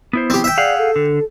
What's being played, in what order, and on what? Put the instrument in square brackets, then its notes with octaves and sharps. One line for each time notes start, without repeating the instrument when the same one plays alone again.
[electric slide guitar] B3 E4 C5
[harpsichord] C4 G4
E5 G5
[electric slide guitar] G#4 F5 F#5 [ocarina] D5
[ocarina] A4
[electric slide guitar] D3